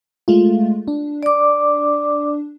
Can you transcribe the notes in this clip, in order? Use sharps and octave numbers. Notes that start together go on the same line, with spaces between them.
G#3 A3 F4
D4
D5 D6